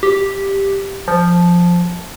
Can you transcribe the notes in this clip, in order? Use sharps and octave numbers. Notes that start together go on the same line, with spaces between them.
G4
F3